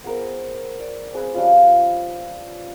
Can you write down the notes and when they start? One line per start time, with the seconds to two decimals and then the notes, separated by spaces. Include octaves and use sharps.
0.04 B3 G#4 A#4 C5
0.80 D5
1.13 C4 G#4 B4
1.34 F3 G3 C#4 F4